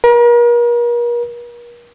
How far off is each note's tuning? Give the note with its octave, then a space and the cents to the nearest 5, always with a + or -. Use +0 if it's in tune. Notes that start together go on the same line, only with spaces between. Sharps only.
A#4 +40